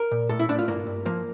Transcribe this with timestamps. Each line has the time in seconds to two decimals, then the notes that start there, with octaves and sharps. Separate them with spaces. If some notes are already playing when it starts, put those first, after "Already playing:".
Already playing: A#4
0.11 A#2
0.29 A2 A4
0.39 E4
0.49 A2 D4
0.59 F4
0.68 G2 A#3
0.87 G2
1.06 F3 A#3